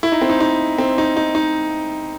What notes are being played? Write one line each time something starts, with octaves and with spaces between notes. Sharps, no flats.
E4
D#4
C4
D#4
D#4
C4
D#4
D#4
D#4